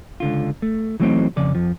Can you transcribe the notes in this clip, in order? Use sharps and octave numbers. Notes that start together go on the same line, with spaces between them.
C#2 D3 F4
A3
E3 F#3 A3 B3 C4 D#4
F2 C#3 D5
F2 F3